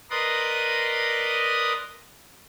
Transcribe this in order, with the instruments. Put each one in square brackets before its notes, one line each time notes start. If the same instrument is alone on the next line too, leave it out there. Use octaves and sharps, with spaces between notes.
[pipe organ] A#4 B4 D5 D#5 C6 D#6